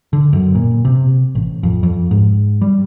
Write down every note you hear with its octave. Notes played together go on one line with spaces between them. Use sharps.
D3
F#2
A#2
C3
A1
F2
F2
G#2
G3